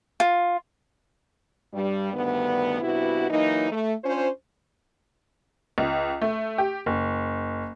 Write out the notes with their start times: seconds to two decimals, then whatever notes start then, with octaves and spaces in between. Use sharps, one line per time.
0.20 F4
1.73 G2 G3
2.13 D2 G2 D#3 B3
2.81 G2 C3 B3 E4 F#4
3.30 E3 F#3 A#3 D#4
3.71 A3
4.03 C#4 D4 F4 C5
5.78 C#2
6.22 A3
6.58 G4
6.86 F#1